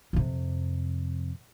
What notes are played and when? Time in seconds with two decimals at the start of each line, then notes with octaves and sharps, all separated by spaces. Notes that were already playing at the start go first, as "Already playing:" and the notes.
0.13 F2 C3